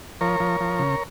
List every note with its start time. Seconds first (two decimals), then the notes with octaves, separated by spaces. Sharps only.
0.21 F3 A#4 C#5
0.40 F3
0.60 F3
0.79 C#3